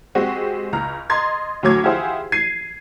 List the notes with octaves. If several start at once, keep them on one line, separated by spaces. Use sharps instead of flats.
G#3 C4 F#4 G4
C#2 A#5 F6
D#5 A#5 C6 G#6 A6
D2 A2 F#3 C#5 D6 G#6
E4 F4 G4 G#4 C5 F#5
G#6 C7 D#7